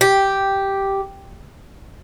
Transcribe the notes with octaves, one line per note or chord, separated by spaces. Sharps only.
G4